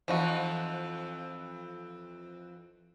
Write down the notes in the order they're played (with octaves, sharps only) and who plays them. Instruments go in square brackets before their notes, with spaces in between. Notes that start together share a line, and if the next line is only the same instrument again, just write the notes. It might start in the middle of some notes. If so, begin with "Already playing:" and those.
[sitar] F2 E3 [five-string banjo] F3 D#4 F#4